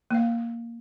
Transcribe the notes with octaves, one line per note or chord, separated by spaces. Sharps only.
A#3 F5